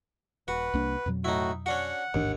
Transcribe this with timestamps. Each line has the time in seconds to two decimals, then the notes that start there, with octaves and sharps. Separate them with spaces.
0.48 D#1 F#4 B4
0.74 C2 A#3 D4
1.06 F2 B2 F#3
1.24 A2 D#4 E4 F#4
1.66 C#4 D4 F#4 F#5
2.14 A1 D#2 G#2 D4